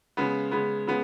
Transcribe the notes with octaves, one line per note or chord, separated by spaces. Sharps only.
C#3 G#3 B3
C#3 G#3 B3
C#3 G#3 B3